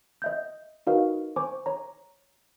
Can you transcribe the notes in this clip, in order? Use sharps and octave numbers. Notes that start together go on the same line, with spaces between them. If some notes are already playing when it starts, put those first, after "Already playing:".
D#5 E5 G6
D#4 F#4 A#4 B4 D#5 F5
C5 G#5 C#6 D6
C#5 A#5